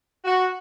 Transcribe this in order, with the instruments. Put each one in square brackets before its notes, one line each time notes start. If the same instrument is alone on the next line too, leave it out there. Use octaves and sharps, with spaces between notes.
[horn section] F#4